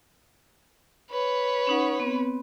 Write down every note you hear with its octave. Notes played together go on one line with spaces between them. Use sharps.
B4 C#5
C#4 D#4 F#5
B3 C4